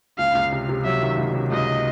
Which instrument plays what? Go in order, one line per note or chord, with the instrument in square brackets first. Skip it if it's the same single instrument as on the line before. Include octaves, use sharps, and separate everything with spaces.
[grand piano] C#2 [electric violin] F5
[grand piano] C#2
C3
C3
[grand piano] F#3 [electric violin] E5
[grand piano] D#3
C#2
C3
[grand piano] C#2 [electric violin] D#5